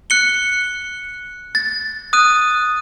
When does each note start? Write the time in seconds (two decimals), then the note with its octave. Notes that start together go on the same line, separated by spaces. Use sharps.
0.10 F#6 C#7 G7
1.55 A6
2.13 D#6 F#6 D#7